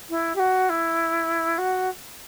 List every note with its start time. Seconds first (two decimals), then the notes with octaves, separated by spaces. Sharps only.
0.09 E4
0.35 G4
0.39 F#4
0.69 E4
1.58 F#4